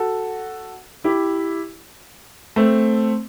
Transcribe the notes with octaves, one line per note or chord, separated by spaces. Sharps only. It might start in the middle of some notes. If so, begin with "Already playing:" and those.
Already playing: F#4 A4
E4 G4
A3 C4